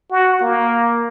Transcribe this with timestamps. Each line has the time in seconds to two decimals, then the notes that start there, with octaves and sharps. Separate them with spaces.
0.11 F#4
0.41 A#3